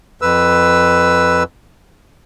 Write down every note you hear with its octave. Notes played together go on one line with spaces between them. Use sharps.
F2 B4 E6